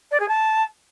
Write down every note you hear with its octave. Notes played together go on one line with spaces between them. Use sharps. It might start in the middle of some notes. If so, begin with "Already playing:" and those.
D5
G#4
A5